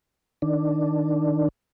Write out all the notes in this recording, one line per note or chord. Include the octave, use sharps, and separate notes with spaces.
D#3 D4